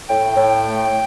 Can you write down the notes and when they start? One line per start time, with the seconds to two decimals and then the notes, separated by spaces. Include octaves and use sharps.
0.09 A2 G5
0.37 A2
0.64 A3